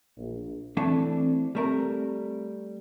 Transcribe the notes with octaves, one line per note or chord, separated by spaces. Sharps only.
A#1
E3 A3 C4 D4
G3 A3 A#4